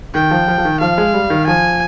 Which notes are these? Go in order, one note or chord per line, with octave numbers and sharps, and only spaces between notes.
D#3 G5
F3
F3
F3
D#3
F3 F5
G#3
G3
D#3
F3 G#5